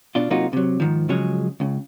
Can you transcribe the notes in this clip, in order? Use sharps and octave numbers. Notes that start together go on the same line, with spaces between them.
B2 D4 F4
C3 F#3 A#3 D#4 F4 F#4
C3 F#3
G#2 D#3 F3
C#3 F3 F#3 G#3 C#4 G#4
C#2 C#3